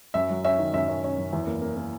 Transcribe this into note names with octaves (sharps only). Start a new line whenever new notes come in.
F#2 E5
F#3
C#4 E5
D#3
F#2 E5
C#4
C#4
F#2
E2
A#3
A#3
A#3